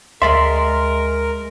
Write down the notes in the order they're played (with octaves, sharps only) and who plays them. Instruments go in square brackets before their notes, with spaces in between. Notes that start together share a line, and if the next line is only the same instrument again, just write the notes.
[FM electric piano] D2 [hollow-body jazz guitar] G#3 D5 E5 [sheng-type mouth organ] A#4 [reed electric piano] C6